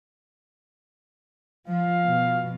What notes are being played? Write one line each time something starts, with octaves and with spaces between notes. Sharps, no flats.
F3 F5
B2 F3